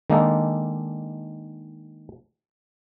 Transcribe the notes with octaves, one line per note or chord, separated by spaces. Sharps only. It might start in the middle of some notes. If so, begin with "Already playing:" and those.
D#3 G#3 A#3 D4 D#4 A4